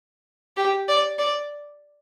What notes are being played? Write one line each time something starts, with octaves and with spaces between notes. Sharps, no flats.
G4
D5
D5